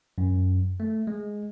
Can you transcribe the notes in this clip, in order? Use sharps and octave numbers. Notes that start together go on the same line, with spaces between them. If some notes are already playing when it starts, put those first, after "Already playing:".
F#2
A3
G#3